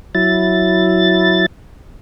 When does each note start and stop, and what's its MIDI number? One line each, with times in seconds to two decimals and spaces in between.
0.15 1.46 54
0.15 1.46 64
0.15 1.46 93